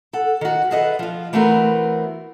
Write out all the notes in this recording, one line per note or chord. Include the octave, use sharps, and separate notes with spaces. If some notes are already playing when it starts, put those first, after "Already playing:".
A4 F#5
D#3 F#4
G#4 A4 B4 D#5 E5 F#5
F3 F4
E3 A3 B3 C4 F#4 A#4